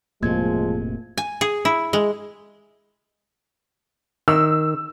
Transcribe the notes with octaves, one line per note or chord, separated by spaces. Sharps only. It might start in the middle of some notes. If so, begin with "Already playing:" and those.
E1 A2 C3 F3 G#3 A#3 G#6
G#5
G#4
E4
G#3
D#3 E6